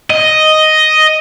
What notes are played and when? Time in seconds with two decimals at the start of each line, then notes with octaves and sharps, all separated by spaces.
0.10 D#5